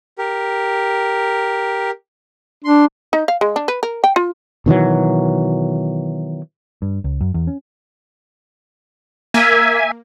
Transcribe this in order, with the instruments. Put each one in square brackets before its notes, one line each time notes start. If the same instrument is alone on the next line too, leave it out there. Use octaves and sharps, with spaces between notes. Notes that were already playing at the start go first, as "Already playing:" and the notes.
[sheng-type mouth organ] G4 A#4
[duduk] D4 [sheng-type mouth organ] C6
[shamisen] D#4
F5
G#3
D4
B4
A#4
G5
F4
[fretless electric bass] B2 D#3 E3 F#3
[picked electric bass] G2
C#2
F#2
E2
C#4
[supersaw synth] A#3 [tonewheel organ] E5 G#5